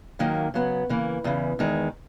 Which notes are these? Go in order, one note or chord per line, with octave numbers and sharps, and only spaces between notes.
D#2 D#3 F#3 A#3
C#3 F#3 B3
C#3 E3 A#3
E2 C#3 E3
E2 D#3 G#3